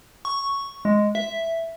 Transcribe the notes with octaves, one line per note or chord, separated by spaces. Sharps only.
C#6
G#3
E5